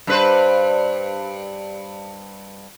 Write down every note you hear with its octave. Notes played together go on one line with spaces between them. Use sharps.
G2 B4 C5